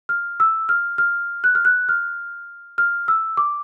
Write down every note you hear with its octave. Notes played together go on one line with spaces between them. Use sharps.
F6
E6
F6
F6
F#6
F6
F#6
F6
F6
E6
D6